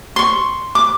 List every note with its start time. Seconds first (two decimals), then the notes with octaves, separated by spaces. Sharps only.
0.16 C6 C#6
0.75 D6